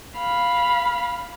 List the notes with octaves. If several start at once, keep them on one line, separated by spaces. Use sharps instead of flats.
F5 B5